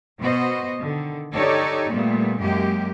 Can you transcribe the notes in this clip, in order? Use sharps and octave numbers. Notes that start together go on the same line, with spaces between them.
B2 B3 F#4 C5 D#5
D3 D#3
D#4 G4 A4 C#5 D5
A#2 G3 A3 B3
F#2 G#3 A#3 G4